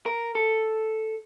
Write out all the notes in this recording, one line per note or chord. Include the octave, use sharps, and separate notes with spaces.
A#4
A4